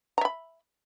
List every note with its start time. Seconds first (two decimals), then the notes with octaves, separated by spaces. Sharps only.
0.18 A#5
0.21 E5
0.25 B5